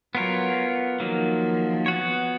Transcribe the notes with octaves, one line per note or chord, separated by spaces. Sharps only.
F#3 B3 F4 A#4 C#5
D#3 F3 F#3 A#3
B3 F#4 C#5